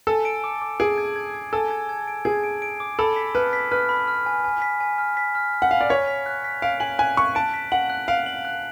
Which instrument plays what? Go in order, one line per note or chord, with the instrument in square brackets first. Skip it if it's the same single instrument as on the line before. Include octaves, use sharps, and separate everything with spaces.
[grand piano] A4 [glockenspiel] G#5
[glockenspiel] D7
D6
D6
[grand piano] G#4 [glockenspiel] D7
[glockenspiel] G#6
G#6
G#6
[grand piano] A4 [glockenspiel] G#5
[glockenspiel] G#6
G#6
D7
[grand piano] G#4 [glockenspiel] G#6
[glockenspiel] D7
D7
D6
[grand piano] A4 [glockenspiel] B5
[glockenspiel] B6
[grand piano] B4 [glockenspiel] F6
[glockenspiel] B6
[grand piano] B4 [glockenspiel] F6
[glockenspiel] B5
F6
G#5
G#5
B6
G#5
F6
B6
F6
F6
[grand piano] F#5
[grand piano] F5 [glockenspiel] G#5
[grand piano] D5
[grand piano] C#5 [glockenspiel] B6
[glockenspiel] B6
F#6
B6
[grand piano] F5 [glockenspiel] D7
[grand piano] G#5 [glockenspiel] F#7
[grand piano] G#5 [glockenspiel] F#6
[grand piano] C#6 [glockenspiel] F#6
[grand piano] A5 [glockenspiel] D7
[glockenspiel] B6
[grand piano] F#5 [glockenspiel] F#7
[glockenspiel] F#6
[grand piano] F5 [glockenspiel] D7
[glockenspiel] F#7
F#6